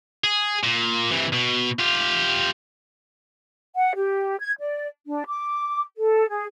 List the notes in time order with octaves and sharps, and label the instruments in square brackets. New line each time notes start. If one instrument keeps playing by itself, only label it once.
[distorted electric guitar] G#4
A#2
C3 E3
B2
F4 G4
[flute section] F#5
G4
G#6
D5
D4
D6
A4
G#4